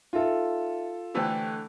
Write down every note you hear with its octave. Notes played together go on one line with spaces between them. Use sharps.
D#4 F4 A4 E5
D3 E3 A3 G4 C5 G5